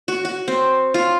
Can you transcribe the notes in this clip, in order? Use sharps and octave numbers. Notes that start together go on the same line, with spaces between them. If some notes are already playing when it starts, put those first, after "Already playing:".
F#4
F#4
C4
F4